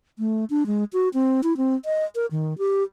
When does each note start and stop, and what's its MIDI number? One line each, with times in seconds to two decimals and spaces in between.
0.19 0.45 57
0.50 0.63 62
0.67 0.84 56
0.93 1.09 66
1.14 1.41 60
1.43 1.56 64
1.57 1.75 60
1.85 2.05 75
2.15 2.26 70
2.31 2.57 51
2.58 2.83 67